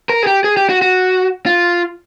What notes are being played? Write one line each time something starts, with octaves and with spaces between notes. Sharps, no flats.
A#4
G#4
G4
G#4
G4
F#4
F#4
F4